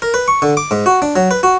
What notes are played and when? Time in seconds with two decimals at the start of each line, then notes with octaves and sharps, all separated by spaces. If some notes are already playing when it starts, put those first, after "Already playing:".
0.02 A#4
0.14 B4
0.28 C#6
0.42 D3
0.57 D6
0.71 G#2
0.86 F#4
1.02 D4
1.16 F#3
1.31 B4
1.43 F#4